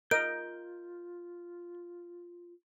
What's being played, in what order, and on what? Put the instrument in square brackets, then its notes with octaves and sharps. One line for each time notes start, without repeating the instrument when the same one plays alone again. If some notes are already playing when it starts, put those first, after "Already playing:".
[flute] F4 [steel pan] A#4 D#5 [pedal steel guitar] G6 [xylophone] D7